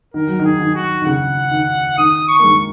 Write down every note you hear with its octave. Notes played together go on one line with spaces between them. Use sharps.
D#3 A#4
F#3
D#3
G#4
D#3
F#4
D#3
C#3 F#5
D#3
D#3 D#6
C#6
A#3
D#3 G#3